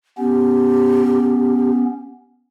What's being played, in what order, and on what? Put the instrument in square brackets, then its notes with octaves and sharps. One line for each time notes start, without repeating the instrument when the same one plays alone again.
[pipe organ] B3 C#4 [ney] G4